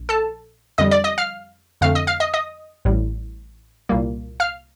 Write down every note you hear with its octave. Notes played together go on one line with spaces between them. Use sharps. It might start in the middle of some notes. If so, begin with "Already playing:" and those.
Already playing: A#1
A4 A5
F2 D3 G3 D#5 D#6
D5 D6
D#5 D#6
F5 F6
F2 D3 A3 C4 F5 F6
D#5 D#6
F5 F6
D#5 D#6
D#5 D#6
A1 A2 G3
C2 A#2 G3 A#3
F5 F6